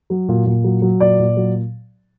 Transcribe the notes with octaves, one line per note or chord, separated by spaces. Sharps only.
F#3
A#2
A#2
F#3
F#3
A#2 D5
A#2
F#3